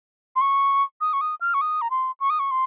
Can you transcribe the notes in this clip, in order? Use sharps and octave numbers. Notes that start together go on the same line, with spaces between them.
C6
C#6
D#6
C#6
D#6
F6
C#6
D#6
A#5
C6
C#6
D#6
C#6
C6